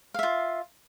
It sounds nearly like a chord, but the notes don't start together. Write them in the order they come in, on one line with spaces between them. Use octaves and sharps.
F5 E5 F4